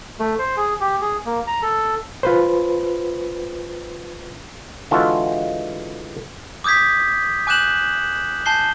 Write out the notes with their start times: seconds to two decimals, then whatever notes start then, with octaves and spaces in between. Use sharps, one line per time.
0.19 A3
0.39 C5
0.57 G#4
0.81 G4
1.01 G#4
1.26 A#3
1.47 A#5
1.62 A4
2.23 F4 B4 C5
4.91 D3 E3 G#3 F4 F#4 A4
6.64 D6 D#6 G6 G#6 B6
7.47 G#5 D6 F#6 G6 E7 F#7
8.46 G#5 A5 G6 C7 G7